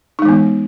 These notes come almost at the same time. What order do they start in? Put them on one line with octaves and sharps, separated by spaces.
D#4 G#3 E3 B3